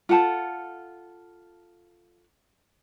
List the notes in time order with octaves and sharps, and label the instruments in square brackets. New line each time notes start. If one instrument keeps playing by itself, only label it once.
[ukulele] F4 A4 F#5 A5